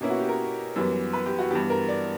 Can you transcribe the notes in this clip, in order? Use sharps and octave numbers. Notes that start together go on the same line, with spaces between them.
B2 A#3 C#4 E4
F#4
G4
A#4
F#2 E3 G3 B3
B4
G4
F#4
G2 E3 B3 G4
A#4
D5